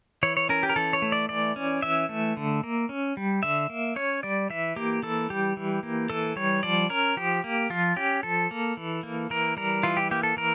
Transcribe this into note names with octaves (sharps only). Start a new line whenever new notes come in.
E3 C#5
C#5
C#4 A#4
G4
A#4
E3 A4
C#5
A3
D5
E3 D5
C#4
E3 E5
A3
D3
A#3
C#4
G3
D3 E5
A#3
C#4 C#5
G3 D5
E3 E5
A#3 G4
E3 A4
G3 G4
E3
A#3
E3 A4
G3 C#5
F3 D5
C#4 A#4
F3 G4
A#3
F3 F4
C#4 G4
F3 A4
A#3
E3
A#3
E3 A#4
G3 A#4
E3 F4
G4
A#3 G4
A4
E3 A#4